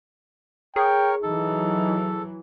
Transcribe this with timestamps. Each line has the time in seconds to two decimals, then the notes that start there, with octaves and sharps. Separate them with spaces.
0.76 G#4 A#4 C#5 G5
1.23 E3 F#3 D#4 A4